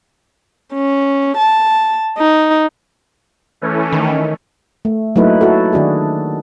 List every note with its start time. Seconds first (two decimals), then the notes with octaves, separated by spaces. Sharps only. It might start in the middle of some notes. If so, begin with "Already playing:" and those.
0.73 C#4
1.37 A5
2.18 D#4
3.61 E3 A3 C#4
3.93 D#3
4.85 A3
5.16 F#3 A3 A#3 D#4 E4 B4
5.41 E4 F#4 A4
5.73 D#3 D4 F#4 G#4